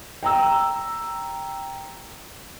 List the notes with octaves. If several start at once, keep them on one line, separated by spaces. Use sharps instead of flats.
G5 A#5 E6